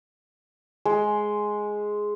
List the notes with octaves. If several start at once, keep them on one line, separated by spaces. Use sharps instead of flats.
G#3